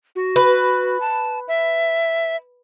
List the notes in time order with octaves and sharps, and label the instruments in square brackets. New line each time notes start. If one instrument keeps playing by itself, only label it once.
[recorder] F#4
[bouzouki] B4
[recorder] A5
E5